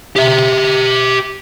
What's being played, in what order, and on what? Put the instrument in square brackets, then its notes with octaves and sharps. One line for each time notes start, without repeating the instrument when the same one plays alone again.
[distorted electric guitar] G4 E5